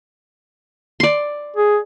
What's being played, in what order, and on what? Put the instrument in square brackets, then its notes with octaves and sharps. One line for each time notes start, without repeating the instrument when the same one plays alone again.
[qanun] D5 C6
[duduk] G#4